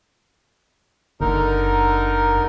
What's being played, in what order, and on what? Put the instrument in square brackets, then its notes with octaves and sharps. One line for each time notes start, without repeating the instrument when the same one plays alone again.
[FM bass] F#1 [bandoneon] D3 D#4 A#4